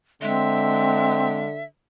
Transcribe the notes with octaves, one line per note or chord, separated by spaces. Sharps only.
D3 G#3 C4 E5